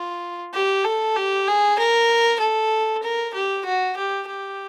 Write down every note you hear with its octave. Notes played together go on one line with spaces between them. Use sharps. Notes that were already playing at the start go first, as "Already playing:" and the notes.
Already playing: F4
G4
A4
G4
G#4
A#4
A4
A#4
G4
F#4
G4
G4